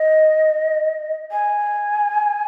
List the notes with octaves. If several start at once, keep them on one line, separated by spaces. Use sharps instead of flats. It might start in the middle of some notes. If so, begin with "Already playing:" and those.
Already playing: D#5
G#5